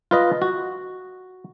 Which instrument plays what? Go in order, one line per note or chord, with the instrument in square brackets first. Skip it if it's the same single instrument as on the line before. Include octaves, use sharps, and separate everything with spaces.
[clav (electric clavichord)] F4 B4 D#5
F#4